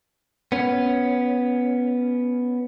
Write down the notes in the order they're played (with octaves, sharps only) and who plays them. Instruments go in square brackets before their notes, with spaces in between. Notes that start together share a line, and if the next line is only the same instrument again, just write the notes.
[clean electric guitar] B3 C#4